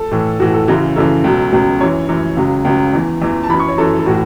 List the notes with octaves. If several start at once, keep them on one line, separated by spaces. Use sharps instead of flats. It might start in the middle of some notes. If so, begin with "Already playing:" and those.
Already playing: A4
A2 E3
A2 E3 F#4
A4
F#2 C#3 E3 F#4
F#2 C#3 E3 A4
C#2 B2 F#3
C#2 B2 F#3
F#2 E3 C#5
F#2 E3
C#2 C#3 F#3
C#2 C#3 F#3
E2 E3
E2 E3
A5
F#2 E3 B5
C#6
C#5
F#2 E3 A4
A4
A2 E3 F#4